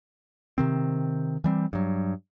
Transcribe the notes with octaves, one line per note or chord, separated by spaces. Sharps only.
C3 D#3 C4
E3 G3 C4
G2 F#3